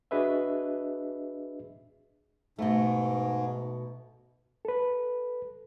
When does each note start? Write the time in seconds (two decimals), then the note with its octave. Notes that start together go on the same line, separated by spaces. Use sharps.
0.11 D4 F#4 G#4 B4 D#5 E5
2.59 G#2 B2 A3
4.65 A4 B4